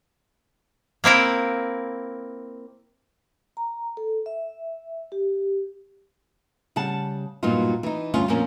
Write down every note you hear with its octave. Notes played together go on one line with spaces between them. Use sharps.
A#3 C4 E4 A#4
A#5
A4
E5
G4
C#3 G3 F#5 A5
G2 A#2 F#3 B3 D#4 F4
E3 D#4
D2 G2 C#4 F4
F2 A#2 F3 A#3 C#4